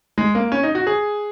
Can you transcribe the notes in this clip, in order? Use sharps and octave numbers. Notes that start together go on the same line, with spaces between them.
G#3
A#3
C#4
D#4
F#4
G#4